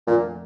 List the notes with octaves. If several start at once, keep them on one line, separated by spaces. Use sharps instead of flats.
F2 A#2 D3 A3